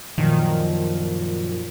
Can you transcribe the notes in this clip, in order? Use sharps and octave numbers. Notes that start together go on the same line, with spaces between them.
F#2 A#2 D#3 F3